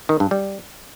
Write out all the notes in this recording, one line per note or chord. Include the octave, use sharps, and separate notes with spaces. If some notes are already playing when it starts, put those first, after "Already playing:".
D#3
G2
G3